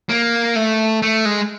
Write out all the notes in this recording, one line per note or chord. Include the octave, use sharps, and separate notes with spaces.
A#3
A3
A3
G#3